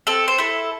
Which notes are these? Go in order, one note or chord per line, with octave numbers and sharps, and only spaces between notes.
C4 A4
C5
E4 A4